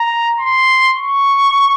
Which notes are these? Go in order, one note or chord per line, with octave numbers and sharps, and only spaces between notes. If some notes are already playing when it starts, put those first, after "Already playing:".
Already playing: A#5
C6
C#6